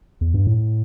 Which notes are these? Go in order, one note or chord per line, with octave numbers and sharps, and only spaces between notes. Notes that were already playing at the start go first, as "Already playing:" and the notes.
E2
G2
A2